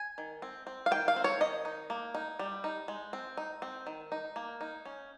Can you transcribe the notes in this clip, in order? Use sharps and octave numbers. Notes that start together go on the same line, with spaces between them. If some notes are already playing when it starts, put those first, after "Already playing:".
Already playing: G#5
D#3
C4
C4
F5
D#3 G5
F5
C4
C#5
D#3 D#5
D#4
A#3
D#4
G3
D#4
G#3
C4
D#4
C4
D#3
D#4
A#3
D#4
C#4